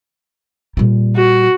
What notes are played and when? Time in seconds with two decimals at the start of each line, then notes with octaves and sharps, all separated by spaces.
0.77 A#2 G3
1.16 F#4